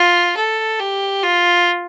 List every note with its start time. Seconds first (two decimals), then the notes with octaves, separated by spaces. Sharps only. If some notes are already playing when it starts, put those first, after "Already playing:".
Already playing: F4
0.37 A4
0.79 G4
1.23 F4